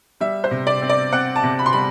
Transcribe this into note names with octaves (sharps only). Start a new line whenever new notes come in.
G3 E5
C5
C3
D5
C4
D5
C4 F#5
A5
C3
B5
C6
G3 B5